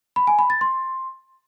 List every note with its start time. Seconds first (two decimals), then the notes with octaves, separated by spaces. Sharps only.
0.16 B5
0.27 G#5
0.39 B5
0.50 A6
0.61 C6